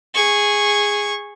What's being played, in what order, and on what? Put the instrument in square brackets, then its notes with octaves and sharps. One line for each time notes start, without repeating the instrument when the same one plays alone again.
[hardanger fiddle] G#4 C#6